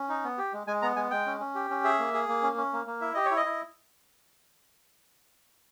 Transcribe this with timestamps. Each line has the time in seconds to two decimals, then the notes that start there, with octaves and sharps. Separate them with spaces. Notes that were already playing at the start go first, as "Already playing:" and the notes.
Already playing: C#4
0.09 D#4
0.24 B3
0.38 G4
0.53 G#3
0.67 G#3 G#5
0.82 B3 A#5
0.96 G#3 G#5
1.11 G#3 G5
1.26 C#4
1.40 C#4
1.55 G4
1.70 C#4
1.84 G#4 E5
1.99 A#3
2.14 G#4
2.28 A#3
2.43 C#4
2.57 C#4
2.73 A#3
2.87 A#3
3.01 E4 E5
3.14 G4 D#5
3.26 C#5
3.31 E4
3.37 D#5
3.46 E4